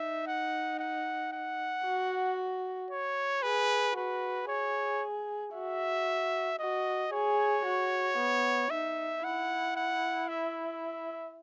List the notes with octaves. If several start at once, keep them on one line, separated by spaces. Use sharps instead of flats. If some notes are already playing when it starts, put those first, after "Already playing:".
Already playing: D#4 E5
F#5
F#5
F#5
F#4
C#5
G#4 B4
F#4 B4
G#4 C#5
F#4 E5
F#4 D#5
G#4 C#5
F#4
B3
D#4 E5
E4 F#5
F#5
E5